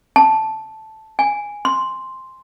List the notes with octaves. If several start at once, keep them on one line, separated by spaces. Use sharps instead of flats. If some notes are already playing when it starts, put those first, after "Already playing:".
A5
G#5
C6